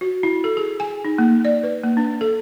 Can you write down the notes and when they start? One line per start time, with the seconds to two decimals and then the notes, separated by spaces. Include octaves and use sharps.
0.01 F#4
0.23 E4
0.44 A4
0.57 G#4
0.80 G#5
1.05 D#4
1.18 A#3
1.45 D5
1.63 B4
1.84 A#3
1.97 D4
2.21 A4